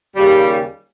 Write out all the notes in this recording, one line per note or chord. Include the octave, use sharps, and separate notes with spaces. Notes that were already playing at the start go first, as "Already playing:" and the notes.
D#2 C#3 G3